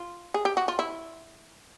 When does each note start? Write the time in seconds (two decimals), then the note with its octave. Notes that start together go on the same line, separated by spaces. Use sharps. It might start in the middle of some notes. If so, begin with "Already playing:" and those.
Already playing: F4
0.34 G#4
0.45 G4
0.57 F#4
0.68 F4
0.79 E4